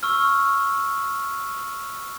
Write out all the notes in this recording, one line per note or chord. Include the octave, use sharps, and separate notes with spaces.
C#6 E6 F6